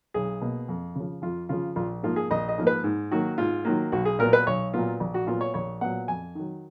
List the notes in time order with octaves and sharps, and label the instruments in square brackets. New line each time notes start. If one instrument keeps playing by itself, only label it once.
[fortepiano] B1 G#4
B2 A#3
F2
C#3 F3
F2 F4
C#3 F3 F4
A#1 F4
G#2 F3 A#3 F4
G#4
A#1 D#5
D#5
G#2 F3 A#3
B4
G#2
D#3 F#3 A#3 F#4
G#2 F4
D#3 F#3 A#3
B1 F#4
G#4
A#2 F#3 B3 A#4
B4
B1 C#5
A#2 F#3 B3 F4
A#1
F#4
A#2 F#3 B3 F4
C#5
A#1 C#5
A#2 F#3 B3 F#5
F2 G#5
D#3 F#3